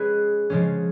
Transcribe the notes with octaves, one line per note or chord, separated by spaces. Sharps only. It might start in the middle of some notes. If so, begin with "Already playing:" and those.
Already playing: G#3 C#4 G#4 B4
C#3 F3 G#3 C#4